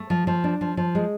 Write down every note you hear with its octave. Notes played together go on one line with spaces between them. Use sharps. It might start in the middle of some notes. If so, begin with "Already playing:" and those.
Already playing: A3
F3
F3
D4
F3
F3
G#3